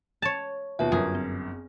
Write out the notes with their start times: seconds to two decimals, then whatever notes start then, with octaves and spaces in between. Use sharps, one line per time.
0.22 C#5 A5
0.79 D#2 B2 F4 B4 E5
0.92 G1 F#2 G#4 A#4
1.15 C4